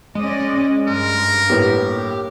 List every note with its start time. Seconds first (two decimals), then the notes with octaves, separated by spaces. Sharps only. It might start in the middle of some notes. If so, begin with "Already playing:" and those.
0.15 G#3 C#4 D5 D#5
0.87 G2 A#4
1.49 A2 A#3 B3 G4